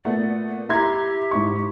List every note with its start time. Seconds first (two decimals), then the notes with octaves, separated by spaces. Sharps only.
0.05 A#2 A3 B3 D5
0.48 A#3
0.69 E4 G4 E5 A#5 C6 G#6
1.31 G#2 E4 C#6